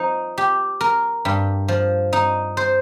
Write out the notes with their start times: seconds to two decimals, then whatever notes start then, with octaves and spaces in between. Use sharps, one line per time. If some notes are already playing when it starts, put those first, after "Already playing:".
Already playing: F3 D#4
0.38 G4
0.81 A#4
1.25 G2
1.68 F3
2.13 D#4
2.57 C5